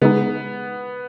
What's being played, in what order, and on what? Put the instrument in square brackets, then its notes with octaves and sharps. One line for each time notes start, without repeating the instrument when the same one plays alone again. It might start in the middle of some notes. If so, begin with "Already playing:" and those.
[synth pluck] C#3 G#3 D#4 G#4 [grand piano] B3